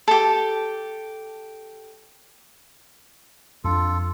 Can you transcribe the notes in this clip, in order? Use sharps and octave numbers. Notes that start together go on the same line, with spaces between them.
G4 A4
F2 D4 F4 A4